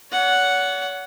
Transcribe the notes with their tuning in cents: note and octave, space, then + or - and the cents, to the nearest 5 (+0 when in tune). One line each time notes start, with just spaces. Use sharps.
C#5 +45 F#5 +0